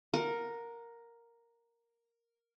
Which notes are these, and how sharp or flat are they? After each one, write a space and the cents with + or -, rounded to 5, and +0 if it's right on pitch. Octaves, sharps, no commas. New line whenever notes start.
A#4 +0 F#5 -35